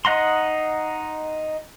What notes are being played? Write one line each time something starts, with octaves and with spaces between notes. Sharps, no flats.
D#4 D#5 F#5 A#5 C6